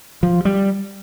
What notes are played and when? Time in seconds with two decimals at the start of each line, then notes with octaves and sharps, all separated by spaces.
0.23 F3
0.45 G3